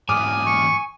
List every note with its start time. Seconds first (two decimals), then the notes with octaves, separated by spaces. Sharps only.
0.09 G#2 E3 G#5 D6 D#6 F6
0.46 C#6